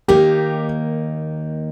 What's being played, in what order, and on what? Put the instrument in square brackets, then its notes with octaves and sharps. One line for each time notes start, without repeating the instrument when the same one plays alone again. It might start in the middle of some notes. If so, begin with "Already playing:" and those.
[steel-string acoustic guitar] D#2 D#3 A#3 D#4 [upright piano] G4